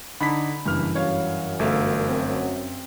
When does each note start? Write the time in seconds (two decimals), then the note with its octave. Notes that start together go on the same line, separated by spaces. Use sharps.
0.21 D3 D4 D#4 B5 B6
0.66 F#1 G2 E3 F6
0.95 F#2 C#5 F5
1.59 G1 A3 E5 F5 E6
2.08 C4